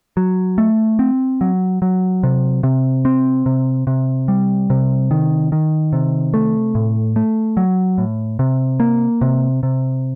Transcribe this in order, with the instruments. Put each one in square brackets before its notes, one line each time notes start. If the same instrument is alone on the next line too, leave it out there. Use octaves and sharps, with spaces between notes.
[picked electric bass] F#3
A3
C4
F#3
F#3
C3
C3
C4
C3
C3
G3
C3
D#3
D#3
C3
A3
A2
A3
F#3
A2
C3
A#3
C3
C3